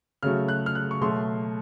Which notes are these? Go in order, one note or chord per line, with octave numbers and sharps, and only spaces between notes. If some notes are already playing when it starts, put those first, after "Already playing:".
C#3 F#3 A3 F6
F#6
F6
F#6
C#6
B2 F#3 A3 C6